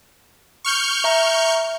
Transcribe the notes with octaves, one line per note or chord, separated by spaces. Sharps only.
C#6 F6 G6
E5 A#5